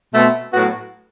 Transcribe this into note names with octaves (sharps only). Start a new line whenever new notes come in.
B2 A3 C4
A2 F#3 B3 F#4